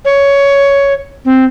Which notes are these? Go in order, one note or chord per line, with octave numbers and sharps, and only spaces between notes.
C#5
C4